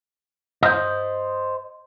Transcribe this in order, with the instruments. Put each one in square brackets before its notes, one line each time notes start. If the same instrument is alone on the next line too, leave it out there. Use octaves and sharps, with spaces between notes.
[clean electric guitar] C5 D#5